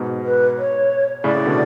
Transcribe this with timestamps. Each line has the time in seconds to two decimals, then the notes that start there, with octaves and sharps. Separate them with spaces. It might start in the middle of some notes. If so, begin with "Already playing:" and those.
Already playing: G#2 B2
0.25 B4
0.58 C#5
1.24 A2 C#3 D5
1.35 A2 C#3
1.46 B2 D3